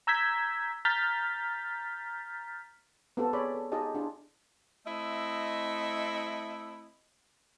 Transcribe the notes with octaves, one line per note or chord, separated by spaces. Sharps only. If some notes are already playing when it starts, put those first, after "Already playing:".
A#5 E6 G6 G#6 B6
A#5 F6 G6 A6 B6
B3 C4 F4 G4 A4
G#4 C#5 D5 B5
A4
D#4 F4 G4 G#4 D#5 A5
D4 E4 F4 G#4
A3 C4 E4 D#5